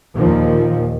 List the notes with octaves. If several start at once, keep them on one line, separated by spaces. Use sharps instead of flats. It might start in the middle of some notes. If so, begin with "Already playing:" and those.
D#2 A#2 D#3 F3